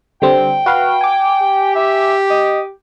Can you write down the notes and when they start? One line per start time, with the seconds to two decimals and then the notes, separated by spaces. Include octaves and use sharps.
0.22 D3 G3 C4 G5
0.66 F#4 B4 F5
1.01 G#5 D6
1.42 G4
1.76 E5
2.30 D#5